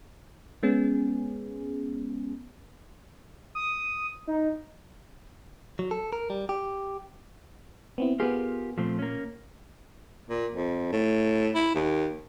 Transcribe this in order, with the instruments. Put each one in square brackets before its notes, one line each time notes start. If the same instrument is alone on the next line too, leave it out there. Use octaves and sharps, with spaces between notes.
[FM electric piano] G#3 B3 C#4 G#4
[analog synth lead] D#6
D#4
[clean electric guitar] F#3
A4
A#4
G3
G4
[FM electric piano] B3 C4 E4
[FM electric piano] B3 G#4 [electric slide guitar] F4 G4 A#4
[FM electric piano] A#2 [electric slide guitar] F3 A3 C4
[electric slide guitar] A#3 C#4
[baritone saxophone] A#2
F2
A2
E4
D#2